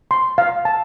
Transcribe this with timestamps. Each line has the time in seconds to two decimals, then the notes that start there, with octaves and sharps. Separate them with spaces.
0.11 C6
0.38 F5
0.65 A5